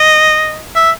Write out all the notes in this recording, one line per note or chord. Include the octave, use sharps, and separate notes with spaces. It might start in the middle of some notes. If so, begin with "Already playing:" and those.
Already playing: D#5
E5